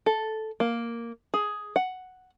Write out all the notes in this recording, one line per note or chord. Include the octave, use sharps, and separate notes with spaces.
A4
A#3
G#4
F#5